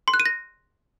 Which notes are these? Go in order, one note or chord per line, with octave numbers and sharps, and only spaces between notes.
C6
F#6
D#7
A#6